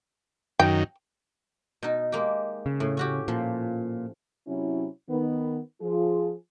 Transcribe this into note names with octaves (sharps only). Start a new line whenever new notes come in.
F#2 D#3 G5
B2 D#4
G#3 A#3 G4
C#3
A2
C#4 F#4 G4
A#2 F3
C3 F#3 C#4 E4
D#3 B3
F3 F4 G#4